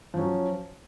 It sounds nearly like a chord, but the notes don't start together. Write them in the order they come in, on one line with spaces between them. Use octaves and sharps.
F3 C#4 F#3